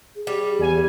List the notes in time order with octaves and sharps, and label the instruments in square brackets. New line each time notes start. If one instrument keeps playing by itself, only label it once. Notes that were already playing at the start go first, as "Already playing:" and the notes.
[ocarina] G#4
[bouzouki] G3
[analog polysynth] E2 G#5